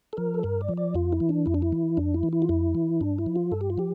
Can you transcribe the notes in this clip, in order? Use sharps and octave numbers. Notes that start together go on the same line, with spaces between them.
A4
F3 A#4
A4
G2 A#4
D5
F3
D5
F2 F4
E4
E3
D4
F2 E4
D4
E4
E3
F2 D4
E4
E3
E4
F4
F2 E4
E3
G2 D4
E4
F3
F4
G2 A4
G4
F4
F3 G4